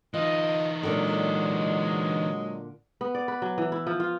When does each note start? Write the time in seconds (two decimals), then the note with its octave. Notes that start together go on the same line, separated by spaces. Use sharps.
0.14 E3 D#4 F4 D#5
0.83 A#2 D3 F#3 G#3
3.01 B3
3.15 D5
3.28 B4
3.42 F#3
3.58 E3
3.72 E4
3.87 F3
4.00 F4